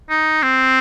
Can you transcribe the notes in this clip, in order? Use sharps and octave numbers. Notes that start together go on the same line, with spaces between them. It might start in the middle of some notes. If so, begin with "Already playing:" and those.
D#4
C4